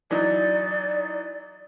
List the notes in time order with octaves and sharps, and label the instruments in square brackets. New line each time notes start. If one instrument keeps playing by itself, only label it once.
[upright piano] E3 F#3 D#4 [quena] D5